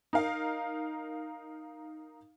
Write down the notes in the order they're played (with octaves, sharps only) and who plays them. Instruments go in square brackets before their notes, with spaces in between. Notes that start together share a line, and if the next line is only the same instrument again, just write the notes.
[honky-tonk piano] D#4 A#4 F5